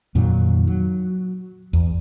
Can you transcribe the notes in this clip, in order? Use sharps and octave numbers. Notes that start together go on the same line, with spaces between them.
F2 A#2 D#3 F#3
F#3
E2